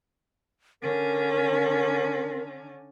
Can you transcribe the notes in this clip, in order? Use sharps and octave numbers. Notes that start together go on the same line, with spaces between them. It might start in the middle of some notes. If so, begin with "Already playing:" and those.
D3 C#4 A#4